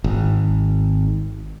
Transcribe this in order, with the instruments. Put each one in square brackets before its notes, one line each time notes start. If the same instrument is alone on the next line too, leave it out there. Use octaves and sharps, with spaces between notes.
[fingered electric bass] G#1